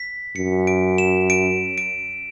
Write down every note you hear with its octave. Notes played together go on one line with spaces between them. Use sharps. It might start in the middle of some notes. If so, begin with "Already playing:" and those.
Already playing: B6
F#2 C#7
D7
E7
D7
D7